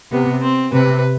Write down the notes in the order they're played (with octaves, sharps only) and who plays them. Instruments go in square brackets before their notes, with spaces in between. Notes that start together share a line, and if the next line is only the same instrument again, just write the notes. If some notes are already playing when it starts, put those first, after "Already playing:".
[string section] C3 [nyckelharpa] B3
[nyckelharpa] C4
[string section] C3 [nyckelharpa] B4